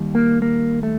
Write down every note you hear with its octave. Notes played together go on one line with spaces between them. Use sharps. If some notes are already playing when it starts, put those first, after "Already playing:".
Already playing: D#2 D#3 G3
A#3
A#3
A3